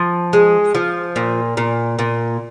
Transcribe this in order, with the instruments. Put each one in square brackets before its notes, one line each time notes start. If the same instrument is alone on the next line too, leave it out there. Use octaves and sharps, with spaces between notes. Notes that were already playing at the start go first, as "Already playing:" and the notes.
Already playing: [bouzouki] F3
G#3
F3
A#2
A#2
A#2